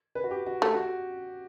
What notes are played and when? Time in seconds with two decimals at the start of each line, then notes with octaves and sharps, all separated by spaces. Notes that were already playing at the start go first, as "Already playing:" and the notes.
0.15 B4
0.24 F#4
0.31 G4
0.47 F#4
0.62 A3 G4
0.74 F#4